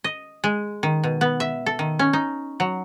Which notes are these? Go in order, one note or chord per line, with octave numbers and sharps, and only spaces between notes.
D#5
G#3
D#3
B2
B3
E5
A4
D#3
C#4
D#4
F#3